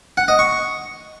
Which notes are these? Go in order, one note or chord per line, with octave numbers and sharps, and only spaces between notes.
F#5
D#5
C#6